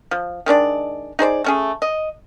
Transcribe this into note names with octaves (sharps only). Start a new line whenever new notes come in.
F3
D#3 G#3 D4 D5
D#4 G#4 C5 D5
A3 C#4 G#4
D#5